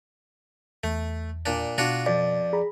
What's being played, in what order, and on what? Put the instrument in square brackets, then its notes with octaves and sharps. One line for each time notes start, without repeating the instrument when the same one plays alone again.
[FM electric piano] E2 [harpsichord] A3
[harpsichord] A#2 D4
[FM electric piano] B2 [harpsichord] D4 F4 F#4
[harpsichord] F2 [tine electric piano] D5
[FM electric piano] G#4 A#5 B5